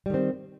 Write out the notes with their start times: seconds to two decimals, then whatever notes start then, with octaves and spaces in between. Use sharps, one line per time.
0.06 G3
0.10 D#3
0.14 C4